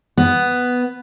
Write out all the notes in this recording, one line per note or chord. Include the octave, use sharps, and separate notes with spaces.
B3